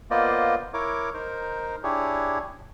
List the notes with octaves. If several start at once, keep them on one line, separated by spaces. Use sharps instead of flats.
A#3 B3 F4 C5 D5 D#5
E4 A#4 C#5 D6
D#4 A#4 C5
D4 E4 G4 G#4 C#5